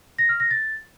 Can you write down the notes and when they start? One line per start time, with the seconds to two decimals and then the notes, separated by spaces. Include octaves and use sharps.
0.18 A#6
0.29 F6
0.40 A#6
0.51 A6